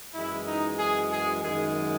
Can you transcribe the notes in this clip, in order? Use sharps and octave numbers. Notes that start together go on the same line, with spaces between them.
F#2 E3 G#3 E4
D#4
G#4
G#4
F#2 D#3 G#3 G#4